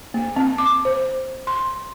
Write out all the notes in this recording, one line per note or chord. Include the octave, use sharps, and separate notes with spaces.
A#3
C4
D6
C5
C6